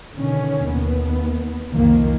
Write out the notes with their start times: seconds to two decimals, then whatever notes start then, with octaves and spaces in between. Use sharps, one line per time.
0.16 B2 D3 D#3 C#4
0.63 D#2 B3
1.72 C2 F2 D#3 F3 A#3